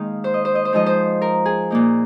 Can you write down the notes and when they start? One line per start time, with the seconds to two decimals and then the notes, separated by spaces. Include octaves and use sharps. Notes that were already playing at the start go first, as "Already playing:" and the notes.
Already playing: D#3 G#3 A#3 D#4 F5
0.24 C5
0.34 D#5
0.45 C5
0.55 D#5
0.65 C5
0.73 F3 G#3 D#4 D#5
0.86 C5
1.22 A#4
1.46 G#4
1.70 A#2 A#3 D#4